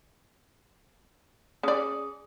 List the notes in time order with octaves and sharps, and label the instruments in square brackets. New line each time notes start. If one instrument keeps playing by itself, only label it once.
[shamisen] C#4 D5 [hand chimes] G#4 D#6